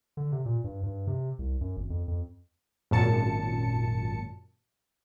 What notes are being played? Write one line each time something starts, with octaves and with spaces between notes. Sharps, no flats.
D3
C3
A#2
G2
G2
C3
C2
F#2
G#1
F2
F2
G#1 F#2 A#2 A5 C#7